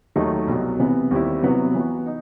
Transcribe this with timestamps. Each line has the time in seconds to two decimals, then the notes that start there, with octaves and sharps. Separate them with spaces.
0.16 D#2 D#3 F#3 A3 D#4
0.47 C2 B2 F#3
0.79 C3 E3 B3
1.11 D#2 D#3 G3 C4 E4
1.43 C3 F#3 B3 E4 B4
1.74 E3 B3 F#4
2.06 D#4